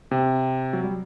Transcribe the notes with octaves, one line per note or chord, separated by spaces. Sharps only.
C3
F#3
G3